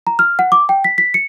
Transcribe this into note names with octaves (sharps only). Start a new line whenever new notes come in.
A#5
F6
F#5
D6
G5
B6
B6
C#7